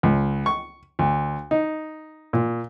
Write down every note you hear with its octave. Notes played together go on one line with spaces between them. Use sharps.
C#2
C#6
D2
D#4
A#2